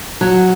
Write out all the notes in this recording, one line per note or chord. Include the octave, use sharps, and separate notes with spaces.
F#3